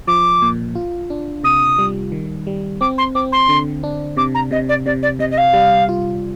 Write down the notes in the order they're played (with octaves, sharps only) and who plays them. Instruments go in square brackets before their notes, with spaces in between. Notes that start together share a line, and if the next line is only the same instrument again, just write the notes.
[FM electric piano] F3 [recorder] D6
[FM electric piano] A#2
F4
D4
[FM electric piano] C3 [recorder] D#6
[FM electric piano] G3
D#3
G3
[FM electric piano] C4 [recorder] D6
[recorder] C6
[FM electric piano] C4 [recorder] D6
[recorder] C6
[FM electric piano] D3
D4
[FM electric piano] C3 [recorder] D6
[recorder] A#5
[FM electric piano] C3 [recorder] D#5
[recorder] D5
[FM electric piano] C3 [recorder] D5
[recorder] D5
[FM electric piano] C3 [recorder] D#5
[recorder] D#5
F5
[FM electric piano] G3
F4